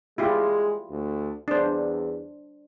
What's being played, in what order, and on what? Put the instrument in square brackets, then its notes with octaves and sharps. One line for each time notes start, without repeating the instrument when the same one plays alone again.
[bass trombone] G#3 [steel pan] E4 F4 G4
[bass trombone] D2
[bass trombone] E2 [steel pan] D4 C5